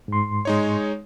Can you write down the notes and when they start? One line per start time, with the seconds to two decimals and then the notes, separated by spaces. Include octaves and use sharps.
0.08 G#2 C6
0.45 G#3 D#4 C#5